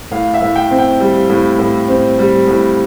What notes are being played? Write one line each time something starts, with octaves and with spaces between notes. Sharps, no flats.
A2 F5
E5
A2
G5
C4
G5
G3
A2
A2
C4
G3
A2